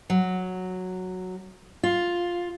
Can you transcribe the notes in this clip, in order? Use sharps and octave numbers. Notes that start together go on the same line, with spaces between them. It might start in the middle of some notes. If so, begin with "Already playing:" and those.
F#3
F4